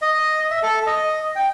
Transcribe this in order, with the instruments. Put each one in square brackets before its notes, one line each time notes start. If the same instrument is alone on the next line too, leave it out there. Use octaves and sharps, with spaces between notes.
[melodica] D#5
E5
A4
D#5
G5